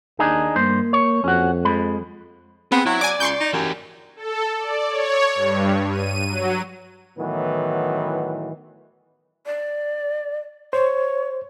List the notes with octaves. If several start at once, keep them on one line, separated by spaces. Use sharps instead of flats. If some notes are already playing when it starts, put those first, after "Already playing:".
D#2 D4 D#4 G#4
G2 A#3 C5
C#5
F2 C#4 F#4
F3 G#3 B5
B3 C4 G#4
F#3 E4
D5 G#5 D6
C#2 C6 C#6 G6
D#4
F#2 E3 G4
A4
D5
C#5
G2
D#7
F#3
A2 D#3 E3 F#3 B3
D5
C5 C#5